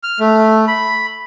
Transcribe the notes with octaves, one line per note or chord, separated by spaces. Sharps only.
F6
A3
B5